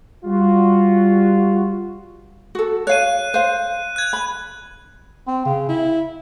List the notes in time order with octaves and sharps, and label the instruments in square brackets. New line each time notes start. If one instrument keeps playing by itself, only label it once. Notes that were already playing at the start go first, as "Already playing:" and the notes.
[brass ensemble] G3 F4 F#4
[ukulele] F#4 A4
[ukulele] C#5 F5 [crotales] F#6 D#7
[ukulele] C5 F5
[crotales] F#6 G#6
[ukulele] B5
[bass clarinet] C4
C#3
E4